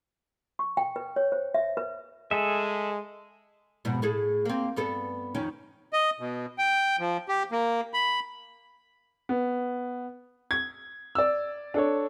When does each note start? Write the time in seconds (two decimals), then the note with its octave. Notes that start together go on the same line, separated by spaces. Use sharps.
0.59 C#6
0.77 G5
0.96 B4
1.16 C#5
1.32 C5
1.54 E5
1.77 B4
2.31 G#3 G#4 A4 E5
3.85 F2 G#2 B2
4.02 A2 G#4 A4
4.45 A#3 C4
4.76 G2 B3 A4
5.35 F2 D#3 C#4
5.93 D#5
6.20 B2
6.58 G5
6.99 F3
7.29 G4
7.52 A#3
7.94 B5
9.29 B3
10.51 G#6
11.15 D5 E6
11.74 D4 A4 C#5